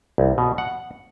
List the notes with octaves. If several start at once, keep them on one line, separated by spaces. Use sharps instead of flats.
C2
B2
F#5